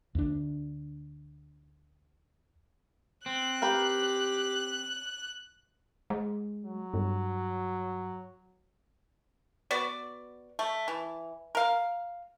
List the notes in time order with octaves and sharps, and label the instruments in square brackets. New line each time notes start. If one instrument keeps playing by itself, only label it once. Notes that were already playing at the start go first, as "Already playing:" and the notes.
[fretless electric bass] D2 D4
[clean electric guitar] C4 [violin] F#6
[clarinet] G4 [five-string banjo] A#4 B4 G5
[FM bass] G#3
[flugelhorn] F#3
[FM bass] G2
[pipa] B3 F#4 D5
A3
E3
A#4 F5